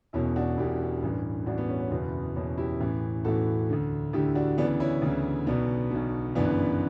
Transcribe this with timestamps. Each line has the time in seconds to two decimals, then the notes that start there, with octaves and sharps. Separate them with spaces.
0.13 E1 E2 B2 C#4 E4
0.36 D4 F#4
0.57 E1 E2 B2 E4 G4
1.03 A1 G2 E3
1.46 A1 G2 E3 D4 F#4
1.58 B3
1.69 C#4
1.80 C#4
1.91 F#1 E2 B2 B3
2.35 F#1 E2 B2 C#4
2.58 E4 G4
2.80 A1 A2 E3
3.24 A1 A2 E3 F#4 A4
3.69 D2 D3
4.13 D2 D3 E4 G4
4.35 D4 F#4
4.58 D2 C#3 E3 B3 D4
4.80 C#4 E4
5.02 D2 C#3 E3
5.46 B1 B2 B3 D4
5.91 B1 B2
6.35 G1 F#2 C#3 E3 B3 D4